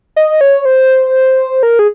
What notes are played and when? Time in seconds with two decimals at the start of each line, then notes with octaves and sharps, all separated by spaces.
0.16 D#5
0.41 C#5
0.65 C5
1.63 A#4
1.79 G#4